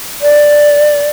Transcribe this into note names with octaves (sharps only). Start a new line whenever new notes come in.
D5